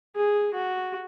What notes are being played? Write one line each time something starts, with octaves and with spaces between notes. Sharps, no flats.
G#4
F#4